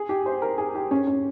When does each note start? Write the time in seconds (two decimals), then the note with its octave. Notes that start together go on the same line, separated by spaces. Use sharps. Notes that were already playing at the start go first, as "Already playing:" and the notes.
Already playing: G#4
0.09 G4
0.26 C5
0.42 A#4
0.58 G#4
0.75 G4
0.91 C#4
1.07 C#4